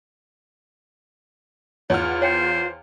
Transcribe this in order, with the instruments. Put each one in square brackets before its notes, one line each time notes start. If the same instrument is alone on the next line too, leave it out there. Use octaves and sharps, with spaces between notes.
[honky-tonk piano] E2 F#5 F6 [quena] F4 [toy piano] C#5
[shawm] C5 [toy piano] C#5 F5 G5